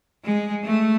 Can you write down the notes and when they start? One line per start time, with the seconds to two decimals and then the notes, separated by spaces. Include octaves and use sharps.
0.24 G#3
0.64 A3